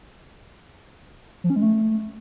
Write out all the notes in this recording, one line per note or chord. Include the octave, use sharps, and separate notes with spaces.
F3
C#4
G#3
A3